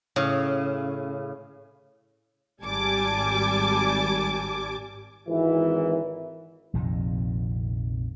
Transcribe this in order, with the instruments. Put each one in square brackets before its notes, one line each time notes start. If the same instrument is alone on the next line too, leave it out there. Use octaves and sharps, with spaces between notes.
[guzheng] A2 C#3
[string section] G#1 G3 G#5 A5 D6
[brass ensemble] G#1 E3
[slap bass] A#1 F2 C3 D#3